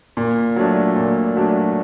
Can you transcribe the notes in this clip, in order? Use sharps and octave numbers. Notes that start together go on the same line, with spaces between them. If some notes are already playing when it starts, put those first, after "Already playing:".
A#2
F#3 A3 D4
A#2
F#3 A3 D4